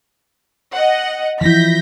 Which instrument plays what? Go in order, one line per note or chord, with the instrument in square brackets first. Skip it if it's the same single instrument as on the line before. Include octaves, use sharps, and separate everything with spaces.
[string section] D#5 F#5
[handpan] E3 F3 E4 [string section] G6 A#6 B6